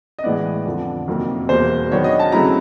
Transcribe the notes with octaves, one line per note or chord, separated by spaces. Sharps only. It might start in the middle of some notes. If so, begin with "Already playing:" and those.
D#5
A2 E3 G#3 B3 D5
F2 D3 F3
F2 C3 D#3 F#3 A#3
E2 B2 G3 A#3 C5
D#3 F#3 B3 D4 C#5
D#5
A5
C#3 F#3 A3 C4 E4 A#5